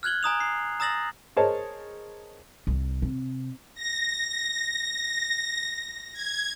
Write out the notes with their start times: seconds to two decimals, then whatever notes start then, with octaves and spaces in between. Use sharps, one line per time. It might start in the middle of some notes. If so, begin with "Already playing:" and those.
0.03 F6 F#6 G#6 F#7 G7
0.23 G#5 A#5 D#6 F7
0.40 C7
0.80 A#5 D#6 E6 A6 A#6 F#7
1.36 G#4 A#4 C5 C#5 D#5 A5
2.67 C2
3.02 C3
3.74 A#6
6.13 G#6